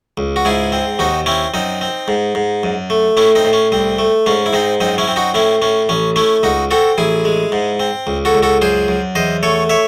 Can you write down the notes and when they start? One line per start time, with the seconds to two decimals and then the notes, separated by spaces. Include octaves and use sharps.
0.17 C#2
0.36 F#4
0.45 G#2 E4 G#4
0.72 C4
0.99 D#2 D#4 F#4
1.26 C4 C#4 E4
1.54 F#2 C4 D#4
1.81 C4
2.08 G#2
2.35 G#2
2.63 F#2
2.90 A3
3.17 A2 C#4 E4
3.35 C4 D#4
3.45 A2
3.53 C#4
3.72 C2 C4
3.99 A3
4.26 G#2 C#4
4.46 E4
4.53 G#2 C4 D#4
4.80 F#2 C4 D#4
4.98 C#4 E4
5.08 C4
5.16 D#4 F#4
5.34 A2 C#4 E4
5.62 A2 C#4
5.89 A1 C#4
6.16 A3 C#4 E4
6.43 C#2 D#4 F#4
6.71 C4 F#4 A4
6.98 A1 E4 G#4
7.25 G#3
7.52 G#2
7.80 C4
8.07 C#2
8.25 F#4 A4
8.35 C#2
8.43 F#4 A4
8.62 F#2 G#4 C5
8.88 F#2
9.15 E2 C5 D#5
9.43 A3 A4 C#5
9.70 C#5 E5